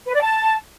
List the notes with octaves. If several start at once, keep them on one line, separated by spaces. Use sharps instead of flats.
B4
D5
A5